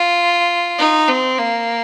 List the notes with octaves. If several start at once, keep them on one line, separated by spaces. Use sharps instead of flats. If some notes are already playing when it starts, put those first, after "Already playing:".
Already playing: F4
D#4
C4
A#3